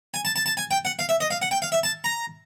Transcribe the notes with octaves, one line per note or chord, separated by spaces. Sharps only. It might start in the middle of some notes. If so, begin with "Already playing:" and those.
G#5
A5
A5
A5
G#5
G5
F#5
F5
E5
D#5
F5
F#5
G5
F5
E5
A5
A#5